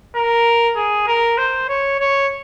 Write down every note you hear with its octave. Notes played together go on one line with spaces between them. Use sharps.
A#4
G#4
A#4
C5
C#5
C#5